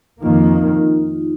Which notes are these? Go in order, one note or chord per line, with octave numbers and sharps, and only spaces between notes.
F2 D#3 A#3 F4
D#4
D#4